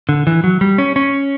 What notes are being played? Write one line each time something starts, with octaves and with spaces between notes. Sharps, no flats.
D3
E3
F#3
G3
C#4
C#4